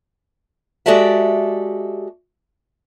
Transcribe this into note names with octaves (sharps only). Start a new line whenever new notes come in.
G#3 F#4 G4 A4 D5 E5